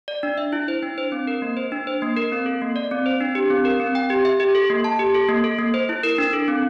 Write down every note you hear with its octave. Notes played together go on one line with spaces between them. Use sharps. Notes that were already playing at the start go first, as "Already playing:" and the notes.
D5
D4
E5
E4
C5
D4
C5
C4
A#4
A#3
C5
D4
C5
A#3
A#4
C4
A4
A#3
D5
C4
C5
D4
G4
C4
A#4
C4
G5
G4
E5
G4
A4
A#3
A5
G4
A4
A#3
A4
A#3
C5
E4
A#4
D4
A4
C4